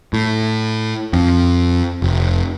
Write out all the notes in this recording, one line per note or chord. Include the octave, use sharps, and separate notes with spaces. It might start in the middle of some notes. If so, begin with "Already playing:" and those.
A2
F2
F1